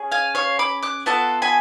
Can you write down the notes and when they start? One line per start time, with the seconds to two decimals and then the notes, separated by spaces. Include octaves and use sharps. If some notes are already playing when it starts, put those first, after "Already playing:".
Already playing: C#4 G#4
0.11 F5 G#5
0.35 C#5 F5
0.59 B5 D6
0.83 D6 F#6
1.06 B3 F4 A4 F#5 A5
1.42 G#5 B5